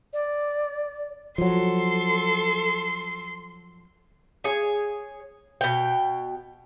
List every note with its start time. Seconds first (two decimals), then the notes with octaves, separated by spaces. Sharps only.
0.13 D5
1.38 F3 F#3 A4 C6
4.44 G#4 C#5 G#5
5.61 B2 G5